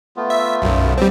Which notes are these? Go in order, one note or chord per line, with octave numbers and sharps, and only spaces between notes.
A3 B3 F4
E5
B1 F#2
G3 C4